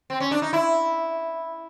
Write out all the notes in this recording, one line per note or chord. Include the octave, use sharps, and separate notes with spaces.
C4
C#4
D4
D#4
E4